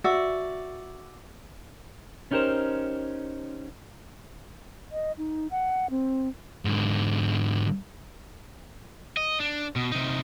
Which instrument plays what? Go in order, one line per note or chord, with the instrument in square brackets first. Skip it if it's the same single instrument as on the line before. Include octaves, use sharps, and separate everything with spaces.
[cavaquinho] F#4 D5 E5
[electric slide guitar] B3 C#4 D#4 G4 A#4 C5
[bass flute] D#5
D#4
F#5
C4
[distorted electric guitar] G#2 D3
[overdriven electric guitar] D#5
D4
B2
C3 D#4